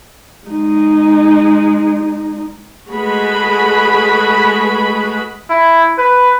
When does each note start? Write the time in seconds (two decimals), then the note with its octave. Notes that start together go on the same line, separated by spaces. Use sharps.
0.48 G#3 D#4
2.90 G#3 A3 F#4 G#4 B4 B5
5.50 E4
5.98 B4